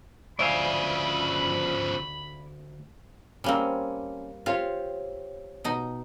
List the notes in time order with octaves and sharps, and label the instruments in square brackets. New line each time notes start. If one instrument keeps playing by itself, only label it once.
[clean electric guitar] D2 F5 [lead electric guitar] C#3 F3 [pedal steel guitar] D5 E5 G#5 [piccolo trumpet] B5
[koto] G3 A#3 C4 [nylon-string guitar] C#4
[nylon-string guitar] C4 G4 C#5 [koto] F4
[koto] B2 D#4